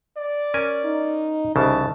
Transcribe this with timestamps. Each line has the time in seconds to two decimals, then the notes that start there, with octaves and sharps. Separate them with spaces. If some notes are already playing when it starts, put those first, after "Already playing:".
0.17 D5
0.54 C#4 A#4 G#5
0.84 D#4
1.56 C2 C#3 E3 D#4 A5